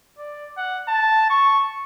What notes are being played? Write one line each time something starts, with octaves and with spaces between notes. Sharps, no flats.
D5
F#5
A5
C#6